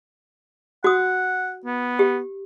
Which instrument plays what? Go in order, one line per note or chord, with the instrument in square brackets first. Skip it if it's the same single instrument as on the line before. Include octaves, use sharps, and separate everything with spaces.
[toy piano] F#4 D#6 [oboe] F#5
[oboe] B3
[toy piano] G4